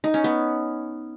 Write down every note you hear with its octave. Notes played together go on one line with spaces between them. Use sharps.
D#4
C#4
B3